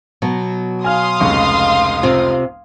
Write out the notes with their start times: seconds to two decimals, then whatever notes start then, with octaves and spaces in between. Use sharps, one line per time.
0.22 B2 F#3
0.84 F5 G#5 C6 D#6 F6
1.20 F1 C#2 C#6
2.03 C3 C4 F4